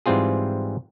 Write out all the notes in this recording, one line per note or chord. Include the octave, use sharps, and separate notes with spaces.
G#2 E3 G3 C4 F4 G#4